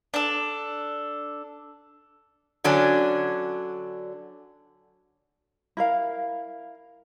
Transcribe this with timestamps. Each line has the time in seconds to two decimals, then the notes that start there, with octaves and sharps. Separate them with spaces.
0.14 D4 A4
2.64 D3 F#3 C#4 D4
5.77 E4 A#4 F5